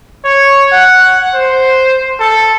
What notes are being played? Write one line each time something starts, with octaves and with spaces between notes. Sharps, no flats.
C#5
F#5
C5
A4